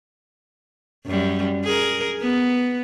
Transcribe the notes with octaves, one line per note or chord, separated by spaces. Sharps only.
F#2 G3
G#4 A#4
B3